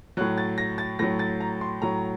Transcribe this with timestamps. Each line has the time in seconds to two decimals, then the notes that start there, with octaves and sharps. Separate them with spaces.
0.17 F#3 F#6
0.21 A2
0.38 A6
0.58 A#6
0.78 A6
0.99 A2 F#3 A#6
1.19 A6
1.40 A#5
1.61 C6
1.82 A2 F#3 A#5